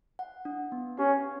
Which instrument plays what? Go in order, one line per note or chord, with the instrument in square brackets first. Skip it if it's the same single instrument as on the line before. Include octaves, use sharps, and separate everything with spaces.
[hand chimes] F#5
D4
B3
[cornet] C#4 [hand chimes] G4